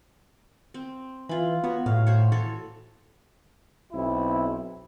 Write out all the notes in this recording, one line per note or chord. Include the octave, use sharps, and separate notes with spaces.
C4
E3 F4 B5
B3 F#4 C#5
A2 F5
F#4 C5 C#5
E3 A4 C#5
B1 C4 E4